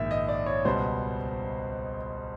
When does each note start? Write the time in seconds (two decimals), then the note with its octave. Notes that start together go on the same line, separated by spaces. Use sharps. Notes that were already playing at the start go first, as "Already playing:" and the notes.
Already playing: A#1 G#2 D#3 E5
0.11 D#5
0.28 D5
0.46 C#5
0.65 C#2 B2 G3 C5